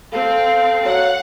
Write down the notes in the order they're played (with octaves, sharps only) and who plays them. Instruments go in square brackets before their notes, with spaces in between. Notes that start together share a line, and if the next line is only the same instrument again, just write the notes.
[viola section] C4 [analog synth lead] A4 [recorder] F5
[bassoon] F#3 [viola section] F#5